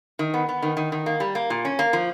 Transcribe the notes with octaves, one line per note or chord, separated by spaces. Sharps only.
D#3
B3
B3
D#3
D#3
D#3
A#3
G3
A#3
A#2
C#4
A#3
F3